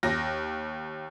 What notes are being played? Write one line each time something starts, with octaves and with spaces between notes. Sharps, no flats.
D#2 A#6